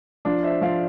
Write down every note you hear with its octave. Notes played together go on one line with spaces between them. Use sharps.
F3 D4 F4
C5 E5
F3 D5 F5